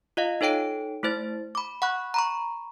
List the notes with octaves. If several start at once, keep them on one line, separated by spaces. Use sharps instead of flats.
F4 D#5 F5
D#4 A4 C#5 G5 D7
A3 E4 C5 A6
B5 D6
F#5 B5 C#6 F#6
A#5 B5 C#6